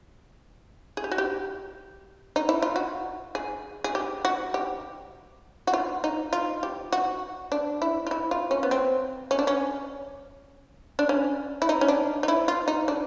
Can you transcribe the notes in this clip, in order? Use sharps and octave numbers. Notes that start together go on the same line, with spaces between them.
G#4
G4
F#4
G4
D#4
E4
F4
F#4
G#4
G#4
G4
F#4
G4
F#4
F4
D#4
F4
G4
F#4
D4
E4
F4
E4
F4
C#4
B3
C4
C#4
D4
C#4
D4
C#4
E4
D#4
C#4
D4
D#4
E4
F4
D#4
D4